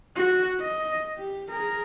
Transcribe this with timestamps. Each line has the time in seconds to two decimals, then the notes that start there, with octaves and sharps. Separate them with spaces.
0.16 F#4
0.60 D#5
1.18 G4
1.50 G#4 A#4